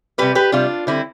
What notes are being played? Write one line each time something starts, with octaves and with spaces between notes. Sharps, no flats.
C3 G3 G4 B4
G4 B4
C3 G3 D4 F4
D3 G3 C4 E4